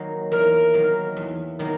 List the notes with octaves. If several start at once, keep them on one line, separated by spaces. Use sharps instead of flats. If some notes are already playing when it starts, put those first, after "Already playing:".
Already playing: D#3 F#3 A#3
E2 A#4
D#3 F#3 A#3
E2
D#3 F#3 A#3